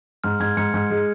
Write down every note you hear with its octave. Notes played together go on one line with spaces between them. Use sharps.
G#2 F6
G#2 G#6
G#2 C#7
G#2
G#3